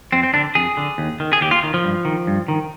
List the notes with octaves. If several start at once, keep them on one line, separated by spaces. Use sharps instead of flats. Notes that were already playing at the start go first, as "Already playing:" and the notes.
F2 C4
C4
D3 D4
F2 G#4
D3
D#2
D#3
G#4
D#2 G4
F4
D#3
F3
G2
D#3
G2
D#3